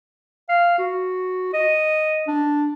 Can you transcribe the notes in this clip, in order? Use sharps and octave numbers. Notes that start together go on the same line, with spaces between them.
F5
F#4
D#5
D4